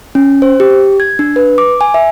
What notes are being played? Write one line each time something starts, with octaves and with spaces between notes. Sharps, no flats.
C#4
C5
G4
G#6
D4
B4
D6
G#5
E5